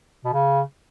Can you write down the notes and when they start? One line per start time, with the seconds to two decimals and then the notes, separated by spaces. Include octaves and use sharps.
0.24 B2
0.33 C#3